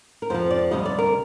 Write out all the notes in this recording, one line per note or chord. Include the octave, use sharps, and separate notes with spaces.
A#4
F2 C3 F3 C5
D5
D2 C3 G3 D#5
D5
A#4